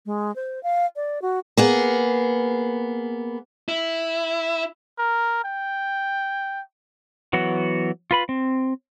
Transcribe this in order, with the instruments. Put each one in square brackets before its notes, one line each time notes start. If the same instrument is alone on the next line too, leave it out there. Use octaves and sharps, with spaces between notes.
[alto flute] G#3
C5
F5
D5
F#4
[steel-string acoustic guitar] A#3 B3 G#4
[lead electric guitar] E4
[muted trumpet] A#4
G5
[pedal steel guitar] E3 F#3 B3 F#4
F4 B4 B5
C4